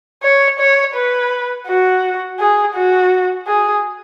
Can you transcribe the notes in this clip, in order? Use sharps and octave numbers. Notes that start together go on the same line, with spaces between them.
C#5
C#5
B4
F#4
G#4
F#4
G#4